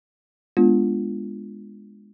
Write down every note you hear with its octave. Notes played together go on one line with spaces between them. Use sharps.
G#3 B3 D4 F4